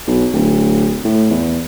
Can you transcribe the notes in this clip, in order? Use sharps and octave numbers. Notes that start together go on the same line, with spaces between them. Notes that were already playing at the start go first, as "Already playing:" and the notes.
B1
D1
A2
E2